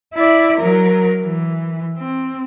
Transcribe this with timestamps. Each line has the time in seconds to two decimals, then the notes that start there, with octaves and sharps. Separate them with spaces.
0.14 E4 D5
0.57 F#3 A#4
1.22 E3
1.98 C4